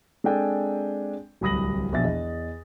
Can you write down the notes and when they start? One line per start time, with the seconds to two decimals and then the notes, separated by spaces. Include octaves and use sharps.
0.24 G#3 C4 D4 A4 G5 G#5
1.41 D1 C2 B5 D#6 A#6 F#7
1.92 A#1 B2 E5 A6
2.04 E2 D#5